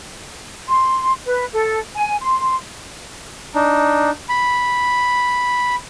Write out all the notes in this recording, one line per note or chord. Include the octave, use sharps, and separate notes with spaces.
C6
B4
A4
G#5
C6
D4 D#4
B5